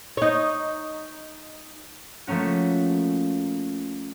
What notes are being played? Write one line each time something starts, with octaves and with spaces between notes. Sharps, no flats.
D#4 C#5
F3 A3 A#3 C#4 F#4